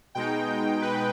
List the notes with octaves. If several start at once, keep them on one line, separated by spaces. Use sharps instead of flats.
B2 G#3 D#4 G5
B4